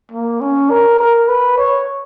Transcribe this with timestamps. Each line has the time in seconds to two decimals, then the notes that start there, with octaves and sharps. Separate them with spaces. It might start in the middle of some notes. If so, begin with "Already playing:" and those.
0.12 A#3
0.41 C#4
0.70 A#4
0.99 A#4
1.28 B4
1.58 C#5